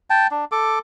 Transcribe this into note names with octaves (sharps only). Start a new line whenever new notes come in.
G5 A5
D4
A4 D6